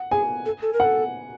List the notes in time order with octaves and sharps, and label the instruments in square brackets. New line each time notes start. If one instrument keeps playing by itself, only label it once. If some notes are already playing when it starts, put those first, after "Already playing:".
Already playing: [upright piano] F#5
[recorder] G#4 [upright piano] G#5
[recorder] A4
A4
A#4
[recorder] A4 [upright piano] F#5